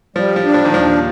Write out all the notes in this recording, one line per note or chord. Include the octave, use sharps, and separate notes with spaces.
F3 G3
F3
D4
F3
D#3
D#2 F3